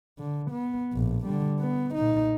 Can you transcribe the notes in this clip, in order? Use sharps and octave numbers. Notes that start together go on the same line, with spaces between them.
D3
B3
A#1 A2
D3 G3
B3
A#2 D#4